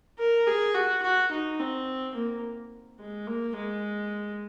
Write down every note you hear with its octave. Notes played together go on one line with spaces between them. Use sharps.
A#4
G#4
F#4
F#4
D#4
C4
A#3
G#3
A#3
G#3